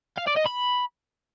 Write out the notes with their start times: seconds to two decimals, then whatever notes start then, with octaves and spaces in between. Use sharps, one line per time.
0.18 F5
0.27 D5
0.37 D#5
0.46 B5